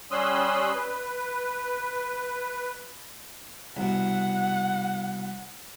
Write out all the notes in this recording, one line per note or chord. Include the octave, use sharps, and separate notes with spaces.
G3 C#4 C6 D#6 E6 F#6
B4
C2 B2 F#5